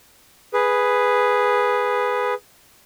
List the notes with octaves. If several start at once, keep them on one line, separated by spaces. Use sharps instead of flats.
G#4 B4